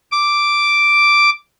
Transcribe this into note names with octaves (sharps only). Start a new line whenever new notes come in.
D6